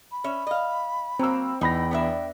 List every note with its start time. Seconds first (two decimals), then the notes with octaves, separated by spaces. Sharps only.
0.12 B5
0.24 C#4 E5
0.47 D#5 F5
1.19 F#3 A#3 C4 E6
1.61 E2 D#4 G5 B5 A#6
1.91 B3 D4 E5